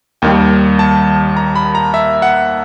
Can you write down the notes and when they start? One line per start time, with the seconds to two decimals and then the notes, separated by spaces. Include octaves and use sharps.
0.22 D#2 D#3 G3 G5
0.79 A5
1.37 A#5
1.55 B5
1.75 A#5
1.94 E5
2.22 F#5